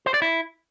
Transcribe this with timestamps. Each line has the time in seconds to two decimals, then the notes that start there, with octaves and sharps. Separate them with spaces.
0.06 C5
0.14 D5
0.22 E4